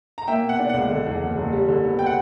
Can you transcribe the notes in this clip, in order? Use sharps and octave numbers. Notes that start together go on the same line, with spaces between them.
A#5
A#3 E5 G5
B2
F#5
D4
C#2 F#5
D3
E2
F#1
F#1
G3
D3
B3
G5
F#5